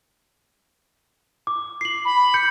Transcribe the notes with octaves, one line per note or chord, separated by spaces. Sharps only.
D6
C7 F#7
B5
G6 C#7